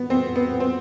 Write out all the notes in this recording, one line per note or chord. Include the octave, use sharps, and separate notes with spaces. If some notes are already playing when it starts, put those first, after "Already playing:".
Already playing: B3
C4
B3
C4